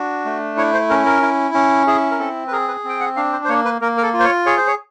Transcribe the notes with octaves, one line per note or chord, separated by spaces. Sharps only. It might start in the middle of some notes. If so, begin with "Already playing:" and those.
Already playing: D4 F#4
A3
E4 C#5
C5
C#4 A#4
A#4
E4
C#4
E4 G#4
A#4
C4 A4
B4
G#4 A#4
B4
C4 G5
F#5
D4 F5
C5
C5
A#3 C#5
B4
A#3 A#4
A#4
A4
F4
C5
C#5
G#4 C#5
C5
C#5